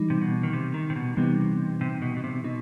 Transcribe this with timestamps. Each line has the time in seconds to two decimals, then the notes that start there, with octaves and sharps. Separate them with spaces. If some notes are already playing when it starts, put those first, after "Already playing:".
Already playing: E3 G3 D#4
0.10 C3
0.21 B2
0.43 D#3
0.53 C3
0.74 D#3
0.90 C3
0.96 B2
1.17 C3 E3 G3 B3 D#4
1.81 C3
2.02 B2
2.17 B2
2.24 C3
2.44 B2 D#4